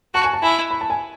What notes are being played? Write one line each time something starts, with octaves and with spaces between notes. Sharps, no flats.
F#4 A5
G#5
A5
E4 G#5
B5
A5
G#5